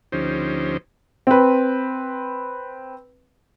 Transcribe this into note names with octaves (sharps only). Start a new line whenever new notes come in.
D2 F3 C#4 D#4 G4 C5
C4 B4